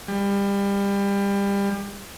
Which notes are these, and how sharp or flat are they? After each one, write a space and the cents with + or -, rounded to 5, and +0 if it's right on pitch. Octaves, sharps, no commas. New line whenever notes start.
G3 +30